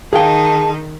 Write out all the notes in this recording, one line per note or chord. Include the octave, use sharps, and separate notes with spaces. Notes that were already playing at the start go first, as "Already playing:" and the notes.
D#3 D#4 G#4 F5 G5 A5